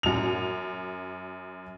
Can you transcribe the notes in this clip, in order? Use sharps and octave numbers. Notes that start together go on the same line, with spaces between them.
F#2 F7